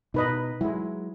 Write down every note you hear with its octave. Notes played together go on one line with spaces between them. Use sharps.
B2 D#4 B4 D#5
F#3 G#3 E4